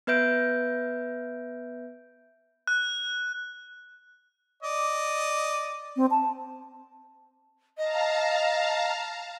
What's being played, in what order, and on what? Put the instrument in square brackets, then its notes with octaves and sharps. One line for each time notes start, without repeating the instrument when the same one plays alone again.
[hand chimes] B3 B4 E5 G6 D7
[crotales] F#6
[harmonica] D5 D#5
[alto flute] C4
A5
[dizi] D#5 [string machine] F5 A5 A#5